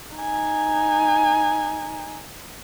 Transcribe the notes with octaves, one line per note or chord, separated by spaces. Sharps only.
D#4 G#5